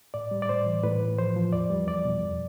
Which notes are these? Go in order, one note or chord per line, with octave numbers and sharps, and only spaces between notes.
A2 D5
G3
D5
A2 C5
E3
A2 B4
A2
F3 C5
F3
E2 D5
G3
E2 D5
B2
F2